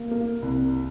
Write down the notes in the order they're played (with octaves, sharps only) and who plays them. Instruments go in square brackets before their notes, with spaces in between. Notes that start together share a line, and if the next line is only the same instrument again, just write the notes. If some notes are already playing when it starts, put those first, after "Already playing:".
Already playing: [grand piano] A#3
A#3
C2